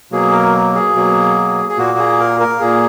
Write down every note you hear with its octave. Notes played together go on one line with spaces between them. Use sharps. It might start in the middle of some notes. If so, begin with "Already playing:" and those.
B2 F#3 A#3 G#4
A#4
G#4
B2 F#3 A#3
G#4
A#2 A#3 F#4
G#4
A#4
A#4
A#2 A#3 G#4